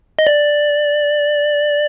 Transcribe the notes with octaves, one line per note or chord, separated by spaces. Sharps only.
D#5
D5